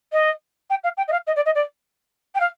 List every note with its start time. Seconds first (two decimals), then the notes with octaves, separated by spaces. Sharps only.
0.12 D#5
0.70 G5
0.84 F5
0.97 G5
1.08 D#5
1.12 F5
1.27 D#5
1.36 D5
1.46 D#5
1.55 D5
2.35 G5
2.40 F5